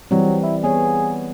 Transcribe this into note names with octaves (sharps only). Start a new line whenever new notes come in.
E3 F#3 G3 C4
E4
B3 G#4 C#5